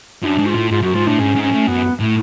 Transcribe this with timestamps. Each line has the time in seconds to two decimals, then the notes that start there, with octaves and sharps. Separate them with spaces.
0.22 F#2 D4 F4
0.38 G#2
0.46 F#4
0.50 A2 F4
0.71 G#2 F4
0.82 F#2 F#4
0.94 G#2 F4
1.07 A2 D4
1.19 G#2 C#4
1.36 G#2
1.43 C#4
1.51 A2
1.67 F#2 B3
2.00 A2